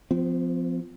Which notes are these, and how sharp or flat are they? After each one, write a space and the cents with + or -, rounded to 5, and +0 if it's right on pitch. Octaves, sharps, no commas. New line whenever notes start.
F3 +0 C4 -40